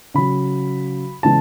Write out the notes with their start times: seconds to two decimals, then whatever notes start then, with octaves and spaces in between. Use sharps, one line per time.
0.14 C#3 F#3 B5
1.23 C#3 E3 G#3 A5